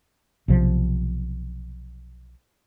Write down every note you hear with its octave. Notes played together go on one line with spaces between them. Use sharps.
B1 C3 F3